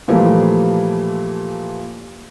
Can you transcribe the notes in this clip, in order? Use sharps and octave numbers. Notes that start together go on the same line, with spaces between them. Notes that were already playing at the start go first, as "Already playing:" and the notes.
A#2 E3 F3 G3 A3 A#3